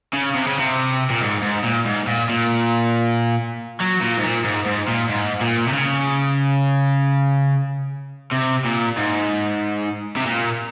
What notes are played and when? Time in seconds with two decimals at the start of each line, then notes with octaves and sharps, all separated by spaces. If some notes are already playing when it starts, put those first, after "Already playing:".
0.14 C#3
0.35 C3
0.47 C#3
0.59 C3
1.10 A#2
1.22 G#2
1.43 G#2
1.64 A#2
1.86 G#2
2.07 A#2
2.29 A#2
3.80 F#3
4.01 A#2
4.17 G#2
4.23 A#2
4.44 G#2
4.66 G#2
4.88 A#2
5.09 G#2
5.41 A#2
5.68 C3
5.74 C#3
8.32 C3
8.65 A#2
8.97 G#2
10.16 C3
10.26 A#2